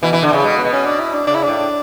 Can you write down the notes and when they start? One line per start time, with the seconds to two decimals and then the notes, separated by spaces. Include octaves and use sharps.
0.03 B2 E3
0.13 E3
0.23 D3
0.30 C#3 E3
0.44 B2 G#3
0.58 B3
0.65 B2
0.72 C#4
0.86 D4
1.00 E4
1.14 D4
1.27 C#3 D4
1.35 E4
1.43 A2 D4